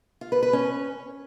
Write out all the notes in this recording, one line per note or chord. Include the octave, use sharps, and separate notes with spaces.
F4
B4
B4
C#4